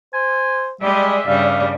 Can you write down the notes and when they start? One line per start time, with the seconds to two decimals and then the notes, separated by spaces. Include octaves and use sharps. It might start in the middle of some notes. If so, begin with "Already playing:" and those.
0.14 C5 G#5
0.81 G3 G#3 G4 G#4 D5 E5
1.27 G2 C#3 G3 F5